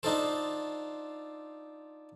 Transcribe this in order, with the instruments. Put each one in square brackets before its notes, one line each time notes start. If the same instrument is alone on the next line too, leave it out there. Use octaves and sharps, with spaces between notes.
[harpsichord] D4 D#4 F4 A4 C5